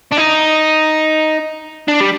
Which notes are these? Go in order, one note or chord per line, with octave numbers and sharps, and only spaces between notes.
D4
D#4
D4
G3